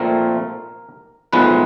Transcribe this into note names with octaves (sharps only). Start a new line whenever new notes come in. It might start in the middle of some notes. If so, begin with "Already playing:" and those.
Already playing: A#2 F3 A3 C4 A#4
B1 A2 F3 G#3 B4